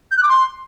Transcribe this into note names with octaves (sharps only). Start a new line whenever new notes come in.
G6
F#6
D6
C6